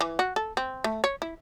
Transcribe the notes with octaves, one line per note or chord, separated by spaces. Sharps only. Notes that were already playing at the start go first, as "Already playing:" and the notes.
E3
F#4
A4
C4
A3
C#5
E4